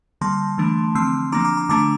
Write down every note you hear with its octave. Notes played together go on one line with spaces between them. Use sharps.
D3 G3 A#3 A5 C6
E3 A3 D4
D3 F3 C4 C6 E6
F3 A#3 D4 A#5 D6
A#5 D6
A#5 D6
D3 A3 D4 A#5 D6